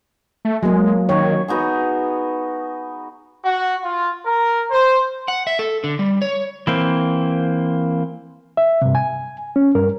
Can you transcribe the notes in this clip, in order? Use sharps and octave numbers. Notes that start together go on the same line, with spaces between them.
A3
F#3 G#3 A#3
D#3 C#5
B3 D#4 F#4 G#4
F#4
F4
A#4
C5
F#5
E5
A4
D3
G3
C#5
E3 A#3 C4
E5
G2 C3
G#5
C#4
G2 A#4